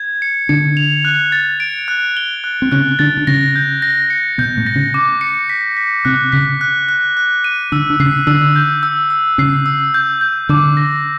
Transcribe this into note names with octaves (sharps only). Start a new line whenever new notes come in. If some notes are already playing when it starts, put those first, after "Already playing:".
Already playing: G#6
C#7
D3 D4 C#7
F7
F#6
A6
D7
F#6
G7
F#6
C4
C#3 C#4 F#6
D3 D4 A6
D4
C#3 C#4 A#6
G6
A#6
C#7
B2 B3 G6
A2 A3
A#6
C#3 C#4
D6
C#7
B6
B6
C3 C4 F#6
C#3 C#4 B6
F#6
F#6
F#6
D#7
D3 D4 E6
D4
C#3 C#4 C7
D3 D4 E6
G6
E6
E6
C#3 C#4 C7
E6
G6
G6
D3 D4 D6
A#6